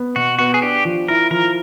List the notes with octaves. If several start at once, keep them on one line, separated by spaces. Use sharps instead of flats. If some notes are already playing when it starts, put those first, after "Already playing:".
Already playing: B3
B2 F#4
B3 F#4
G#4
D4 G4
F3
E4 A#4
F3 A#4